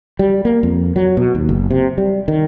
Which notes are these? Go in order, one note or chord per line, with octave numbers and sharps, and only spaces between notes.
G3
A#3
F2
F#3
B2
D#2
F#1
C3
G3
D#3